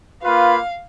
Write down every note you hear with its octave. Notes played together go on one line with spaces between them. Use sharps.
A#3 F4 B4 F5